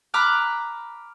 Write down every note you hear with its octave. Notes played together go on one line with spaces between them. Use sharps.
A#5 B5 D6 F6 F#6